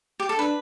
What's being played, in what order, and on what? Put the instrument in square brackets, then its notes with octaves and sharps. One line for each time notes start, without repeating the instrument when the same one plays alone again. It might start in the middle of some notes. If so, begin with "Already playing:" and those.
[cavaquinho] G4
A4
[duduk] D4 [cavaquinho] B4